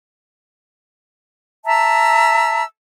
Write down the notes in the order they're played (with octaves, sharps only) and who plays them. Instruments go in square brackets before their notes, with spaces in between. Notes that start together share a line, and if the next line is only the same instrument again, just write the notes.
[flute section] E5 A5 A#5 E6